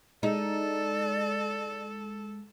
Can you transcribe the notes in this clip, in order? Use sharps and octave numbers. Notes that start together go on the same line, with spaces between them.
G#3 D#4 A4 D5